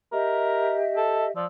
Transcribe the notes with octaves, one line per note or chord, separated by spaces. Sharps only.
G4 A#4 D#5 E5
A4
F3 D5 E6